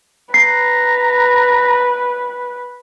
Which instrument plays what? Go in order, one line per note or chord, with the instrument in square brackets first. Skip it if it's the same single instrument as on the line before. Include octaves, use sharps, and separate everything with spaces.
[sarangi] B4 [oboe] A#5 [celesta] C7